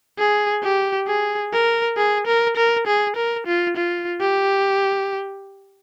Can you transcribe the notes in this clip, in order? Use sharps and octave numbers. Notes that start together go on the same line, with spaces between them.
G#4
G4
G#4
A#4
G#4
A#4
A#4
G#4
A#4
F4
F4
G4